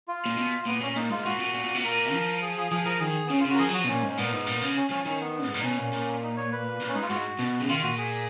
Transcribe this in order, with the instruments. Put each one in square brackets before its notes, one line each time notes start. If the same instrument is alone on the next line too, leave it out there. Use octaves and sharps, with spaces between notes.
[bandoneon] F4
[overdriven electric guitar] A#2
B2
[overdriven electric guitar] A#2 [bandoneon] B3
[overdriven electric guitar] A#2 [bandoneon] C#4
[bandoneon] C#4
[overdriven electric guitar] A#2 [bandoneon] D#4
[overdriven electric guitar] G#2 [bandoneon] F4
[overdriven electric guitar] A#2 [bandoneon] F#4
[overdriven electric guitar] A#2
A#2
A#2
B2
[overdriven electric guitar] A#2 [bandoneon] A#4
[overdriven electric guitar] F3
[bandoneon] G#4
G#4
[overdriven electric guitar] F3 [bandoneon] G#4
[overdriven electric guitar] F3 [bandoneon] A#4
[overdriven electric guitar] D#3 [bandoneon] G#4
[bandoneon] B3
[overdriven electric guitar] C#3 [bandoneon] C#4
[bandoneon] F4
[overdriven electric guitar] C#3
[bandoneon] F#4
A#4
[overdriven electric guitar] F3 [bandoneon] G#4
[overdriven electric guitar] F#3 [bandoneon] F#4
[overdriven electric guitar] F3
B2
[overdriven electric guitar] A#2 [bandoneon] C#4
[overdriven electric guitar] G#2
[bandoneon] C#4
[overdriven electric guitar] A#2 [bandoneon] B3
[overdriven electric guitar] G#2
A#2
C#3
[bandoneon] C#4
[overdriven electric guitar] F3 [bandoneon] C#4
[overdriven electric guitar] D#3 [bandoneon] C#4
[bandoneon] B3
[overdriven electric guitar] G#2
A#2
[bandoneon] D#4
[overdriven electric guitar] B2 [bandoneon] C#4
[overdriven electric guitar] A#2
A#2
[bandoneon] D#4
C#5
B4
[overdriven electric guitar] A#2
[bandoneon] C#4
[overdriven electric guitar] G#2 [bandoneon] D#4
[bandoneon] F4
[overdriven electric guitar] G#2 [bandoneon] F#4
[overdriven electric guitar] B2
C#3
[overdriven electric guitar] D#3 [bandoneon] F4
[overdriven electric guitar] A#2 [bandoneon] F#4
[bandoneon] G#4